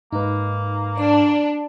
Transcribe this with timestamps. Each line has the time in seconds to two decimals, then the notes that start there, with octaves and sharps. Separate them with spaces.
0.12 G#2 A#3 D#4 B4
0.97 D4 D5